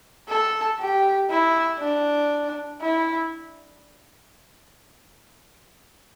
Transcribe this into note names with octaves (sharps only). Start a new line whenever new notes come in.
A4
G4
E4
D4
E4